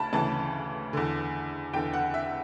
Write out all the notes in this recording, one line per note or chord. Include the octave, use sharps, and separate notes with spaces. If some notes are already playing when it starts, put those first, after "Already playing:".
Already playing: D2 C#3 A5 B5
D2 C#3 E3 A5
E2 D3
E2 D3 G5
F#5
E5